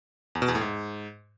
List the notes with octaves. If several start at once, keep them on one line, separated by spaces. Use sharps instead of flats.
E2
B2
E2
A2
G#2